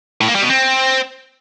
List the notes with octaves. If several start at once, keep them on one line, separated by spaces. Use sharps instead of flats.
A2
A#3
G3
B2
C4